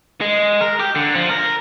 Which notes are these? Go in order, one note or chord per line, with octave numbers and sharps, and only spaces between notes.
G#3
A#4
G4
D3
F3
A#4